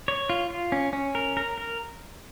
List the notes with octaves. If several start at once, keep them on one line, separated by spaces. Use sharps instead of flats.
C#5
F4
F4
C#4
C#4
A#4
A#4
A#4